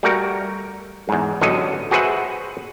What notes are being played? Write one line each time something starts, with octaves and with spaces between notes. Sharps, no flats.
G3 A3 F#4 A#4
E2 G#2
A1 E2 D3 F#3 A4 D#5
F#4 G#4 B4 C5 E5 F#5